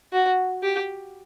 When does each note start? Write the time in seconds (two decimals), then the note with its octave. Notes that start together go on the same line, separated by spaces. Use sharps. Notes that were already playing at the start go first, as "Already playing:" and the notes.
0.13 F#4
0.63 G4